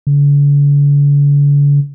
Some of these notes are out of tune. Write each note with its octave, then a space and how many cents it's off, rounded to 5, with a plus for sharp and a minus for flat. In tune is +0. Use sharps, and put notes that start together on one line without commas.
D3 -45